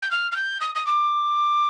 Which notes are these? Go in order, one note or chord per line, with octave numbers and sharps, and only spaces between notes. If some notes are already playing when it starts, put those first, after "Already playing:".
G6
F6
F6
G6
D#6
D#6
D6